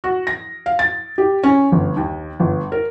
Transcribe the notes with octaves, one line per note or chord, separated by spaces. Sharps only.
F#4
A#6
F5
A6
G4
C#4
G1
D#2
G1
A#4